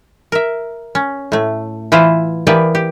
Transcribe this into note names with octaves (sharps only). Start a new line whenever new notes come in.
A#4 E5
C#4
A2 A3
E3 E4 F4 B4 C5 F5
E3 A#3 B3 G4 B4 D5
G4